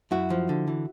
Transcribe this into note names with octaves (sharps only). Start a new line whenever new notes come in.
F#2 E4 F#4
F3
D3
E3